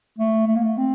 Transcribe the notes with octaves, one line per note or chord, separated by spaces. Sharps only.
A3
A3
A#3
A3
C4